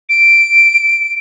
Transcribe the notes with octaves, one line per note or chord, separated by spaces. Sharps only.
D7